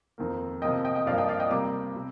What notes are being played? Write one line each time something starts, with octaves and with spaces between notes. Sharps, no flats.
F2 D#3 A#3
C3 F3 A#3 D#5 G5
D#5 G5
D#5 G5
G2 F3 A#3 D5 F5
D#5 G5
D5 F5
D#5 G5
C3 G3 A#3 A#5 D6
C3